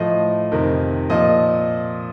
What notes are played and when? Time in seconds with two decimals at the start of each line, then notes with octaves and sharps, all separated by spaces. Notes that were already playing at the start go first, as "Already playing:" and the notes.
Already playing: A2 F3 D#5
0.52 F2 C3 D#3
1.10 A#2 F3 D#5